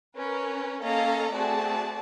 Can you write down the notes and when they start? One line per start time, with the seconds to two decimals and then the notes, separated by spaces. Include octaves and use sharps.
0.15 C#4 A#4 B4
0.82 A#3 C#4 A4 D#5 F5 A#5
1.32 A3 C4 F#4 G#4 D5 A5